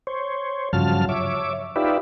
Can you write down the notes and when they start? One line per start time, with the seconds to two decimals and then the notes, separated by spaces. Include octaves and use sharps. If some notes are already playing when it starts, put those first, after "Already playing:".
0.07 C5 C#5
0.73 G2 C#3 F3 F#3 A5 F6
1.09 C#5 E5 D6
1.76 D#4 F4 G4 B4 D5 E5